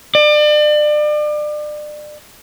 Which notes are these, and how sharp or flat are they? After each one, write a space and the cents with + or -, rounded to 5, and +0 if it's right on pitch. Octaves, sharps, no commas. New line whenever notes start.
D5 +35